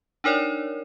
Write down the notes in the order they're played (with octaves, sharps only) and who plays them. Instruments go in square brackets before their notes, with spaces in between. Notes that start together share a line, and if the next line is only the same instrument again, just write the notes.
[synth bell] D4 D#4 A#4 C#5 D5